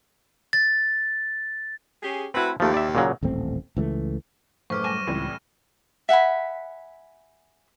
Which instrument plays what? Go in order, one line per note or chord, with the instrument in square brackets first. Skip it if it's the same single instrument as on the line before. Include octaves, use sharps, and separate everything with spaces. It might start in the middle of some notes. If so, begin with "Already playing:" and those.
[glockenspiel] A6
[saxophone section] C#4 G4 G#4
[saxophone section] A3 F#4 B4 [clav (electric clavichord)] C4 E4
[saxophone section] D#2 [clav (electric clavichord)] F3 A3
[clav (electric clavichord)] D5 E5
A#2 C#3 F#3
[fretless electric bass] D#1 A1 A3 C4
C#2 E3 F3 A3
[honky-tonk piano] F#1 D6 [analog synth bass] A2 [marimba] B4 C5 [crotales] C#6 F6
[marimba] G3 G#5 A5 [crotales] A#6 D#7 E7
[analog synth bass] C#2 [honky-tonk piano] A2 E3 G3 [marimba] C4
[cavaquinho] E5 F#5 G#5 B5